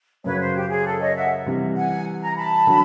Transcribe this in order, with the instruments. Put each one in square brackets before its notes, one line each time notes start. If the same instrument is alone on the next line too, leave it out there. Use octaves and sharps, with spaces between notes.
[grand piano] F#2 C#3 F#3 [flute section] B4 C#5
[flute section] C5
G4
G#4
A4
C#5 D#5
E5 F#5
[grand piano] C3 E3 G3
[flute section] F#5 G#5
G#5 A#5
A5 B5
[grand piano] D3 F#3